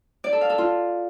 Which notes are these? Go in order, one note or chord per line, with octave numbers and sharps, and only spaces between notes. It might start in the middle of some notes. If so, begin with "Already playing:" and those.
D5
A4
F5
A4
F4